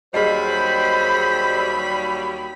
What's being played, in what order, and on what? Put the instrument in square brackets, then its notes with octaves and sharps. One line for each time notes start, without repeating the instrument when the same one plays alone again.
[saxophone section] D#2 F#3 G3 [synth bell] G#4 D#5 [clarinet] C5 [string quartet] B5